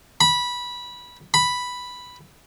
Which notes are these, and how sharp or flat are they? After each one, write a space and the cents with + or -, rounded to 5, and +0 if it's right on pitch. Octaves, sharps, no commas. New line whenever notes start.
B5 -15
B5 +0